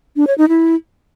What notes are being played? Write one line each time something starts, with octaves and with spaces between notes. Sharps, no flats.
D4
C#5
D#4
E4